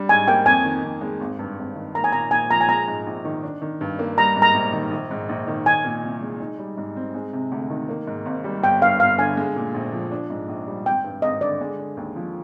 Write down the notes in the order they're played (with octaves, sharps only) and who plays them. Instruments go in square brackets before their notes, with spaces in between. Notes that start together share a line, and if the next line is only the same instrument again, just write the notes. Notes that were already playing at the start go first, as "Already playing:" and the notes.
Already playing: [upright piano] G3 D4
[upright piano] G#2 [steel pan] G#5
[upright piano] A#3 [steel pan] G5
[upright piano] F2 [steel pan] G#5
[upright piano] D#3
F2
G#3
G#1
G2
G#1
D#3
[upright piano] A#3 [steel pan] A#5
[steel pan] G#5
[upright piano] A#2 [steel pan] A#5
[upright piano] A#1 [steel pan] G#5
[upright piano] F3 [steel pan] A#5
[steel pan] G#5
[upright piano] G#3 [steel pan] A#5
[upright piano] G#2
A#1
D#3
D4
D#3
G2
A#3
[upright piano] G3 [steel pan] A#5
[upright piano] G#2
[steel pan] A#5
[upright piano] A#1
D#3
A#1
G#2
A#1
D#3
[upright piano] D#4 [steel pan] G#5
[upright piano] A#2
C2
G#3
D#4
G3
G#2
C4
G#3
C3
D2
D#3
A#3
G#2
G#1
G3
[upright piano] G1 [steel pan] G5
[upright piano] G2 [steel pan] F5
[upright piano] G1 [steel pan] F5
[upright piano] D3 [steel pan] G#5
[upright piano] G#3
A#2
A#1
F3
D4
G#2
A#1
G3
[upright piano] G#1 [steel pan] G5
[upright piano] G2
[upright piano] G#1 [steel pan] D#5
[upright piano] D3 [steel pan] D5
[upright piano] G#3
D3
D#2
F3